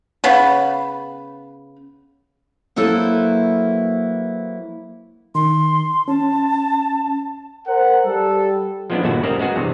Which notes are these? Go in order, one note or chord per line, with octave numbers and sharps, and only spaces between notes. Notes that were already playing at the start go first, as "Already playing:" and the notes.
C#3 B3 B4
F#3 A#3 E4 A4 B4 C5
D#3 C6
C#4 A5
A#4 C5 F#5
G3 A4
F3 G#3 B3 C#4 D4 E4
G1 D#2 A#2 E4 F#4 G#5
G3 C4 C#4 A#4 D#5 F#5
G#3 B3 F#4 G#4
E2 G2 C3